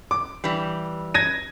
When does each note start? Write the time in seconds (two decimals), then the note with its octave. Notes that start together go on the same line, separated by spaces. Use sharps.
0.11 D6
0.44 E3 G3
1.14 G#6 A#6 D#7